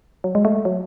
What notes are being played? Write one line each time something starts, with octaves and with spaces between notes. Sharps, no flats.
F#3
G#3
A3
F#3